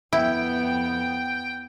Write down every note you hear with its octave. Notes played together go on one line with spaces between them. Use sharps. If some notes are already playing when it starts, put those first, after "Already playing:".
F2 B3 E4 G5